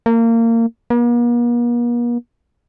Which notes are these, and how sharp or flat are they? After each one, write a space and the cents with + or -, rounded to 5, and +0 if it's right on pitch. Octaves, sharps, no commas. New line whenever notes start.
A#3 -25
A#3 +45